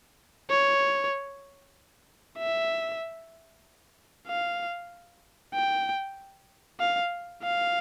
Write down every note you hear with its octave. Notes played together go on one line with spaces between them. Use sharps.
C#5
E5
F5
G5
F5
F5